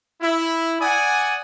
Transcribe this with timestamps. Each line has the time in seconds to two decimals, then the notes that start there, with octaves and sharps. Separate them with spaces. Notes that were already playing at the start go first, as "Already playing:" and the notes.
0.21 E4
0.81 D5 F#5 G#5 D#6